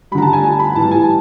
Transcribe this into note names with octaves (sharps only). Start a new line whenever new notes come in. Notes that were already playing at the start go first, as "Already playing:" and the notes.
D3 G3 A#5 B5
A5
G#5
G#5
B5
A2 E3 G3 A5
G#5